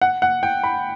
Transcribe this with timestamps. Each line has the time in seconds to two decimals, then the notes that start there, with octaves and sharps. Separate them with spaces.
0.02 F#5
0.22 F#5
0.43 G5
0.64 B5